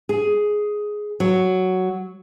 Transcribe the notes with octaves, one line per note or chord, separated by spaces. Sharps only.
G#4
F#3